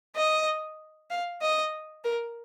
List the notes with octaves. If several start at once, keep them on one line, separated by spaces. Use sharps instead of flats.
D#5
F5
D#5
A#4